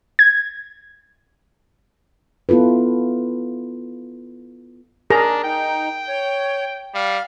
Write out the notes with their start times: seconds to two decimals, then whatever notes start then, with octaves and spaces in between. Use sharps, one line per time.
0.19 G#6
2.49 B3 E4 F4 A4 B4
5.10 D4 G#4 A#4 A#5
5.44 D#4 G5
6.08 C#5
6.95 G3 F5 F6